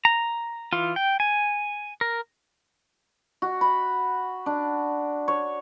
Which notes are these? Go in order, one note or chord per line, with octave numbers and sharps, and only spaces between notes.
A#5
E3 F4
G5
G#5
A#4
F#4
B5
D4
C#5